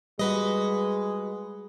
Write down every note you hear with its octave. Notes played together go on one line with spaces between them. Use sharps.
G3 G#3 F#4 B4 D#5